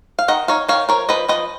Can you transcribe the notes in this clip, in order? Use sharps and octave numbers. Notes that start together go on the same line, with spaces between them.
F5
D#3 D#5 F#5
D#4 C#5 F5
D#3 C#5 F5
F3 A#4 C#5
F3 B4 D#5
F3 B4 D#5